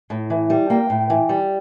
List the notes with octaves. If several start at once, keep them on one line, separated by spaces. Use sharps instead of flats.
A2
E3
G3
A#3 G5
A2
E3
G3